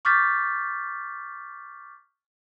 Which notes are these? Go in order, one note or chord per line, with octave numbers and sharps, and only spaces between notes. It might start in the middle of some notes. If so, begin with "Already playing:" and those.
C#6 D6 F6 G6 A6 B6